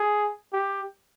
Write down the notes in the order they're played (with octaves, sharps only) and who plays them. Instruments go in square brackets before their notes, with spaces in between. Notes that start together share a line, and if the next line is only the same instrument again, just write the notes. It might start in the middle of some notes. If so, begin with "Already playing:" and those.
Already playing: [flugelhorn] G#4
G4